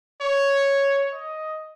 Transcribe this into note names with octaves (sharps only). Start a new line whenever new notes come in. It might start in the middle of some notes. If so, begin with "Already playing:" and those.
C#5
D#5